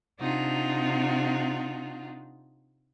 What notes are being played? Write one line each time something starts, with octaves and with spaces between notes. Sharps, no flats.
C3 D4 D#4 F4 F#4